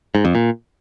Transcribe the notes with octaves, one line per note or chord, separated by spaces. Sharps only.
G#2
F2
A#2